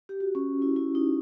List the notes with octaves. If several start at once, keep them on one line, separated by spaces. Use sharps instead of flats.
G4
F#4
C#4
E4
E4
D#4